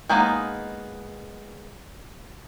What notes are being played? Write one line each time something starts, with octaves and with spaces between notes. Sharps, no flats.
G#3 A#3 B3 D#4